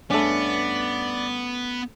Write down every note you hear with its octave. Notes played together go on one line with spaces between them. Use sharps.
G2 A3 B3 C#4 D5